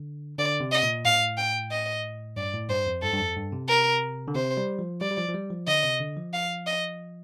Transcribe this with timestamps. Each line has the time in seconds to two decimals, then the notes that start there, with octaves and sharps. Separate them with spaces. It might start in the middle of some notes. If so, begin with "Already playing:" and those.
Already playing: D3
0.38 D3 D5
0.60 C3
0.72 D#5
0.83 A#2
1.05 A2 F5
1.38 G5
1.71 D#5
2.36 G2 D5
2.54 A2
2.69 G2 C5
2.86 F2
3.02 G2 A4
3.13 G2
3.19 F2
3.36 G2
3.52 C3
3.69 A#4
4.28 D3
4.35 C3 C5
4.57 G3
4.79 F3
5.01 G3 D5
5.11 G3
5.18 F3
5.29 F3
5.34 G3
5.51 F3
5.67 D3 D#5
5.84 C3
6.00 D3
6.17 F3
6.33 F5
6.67 D#5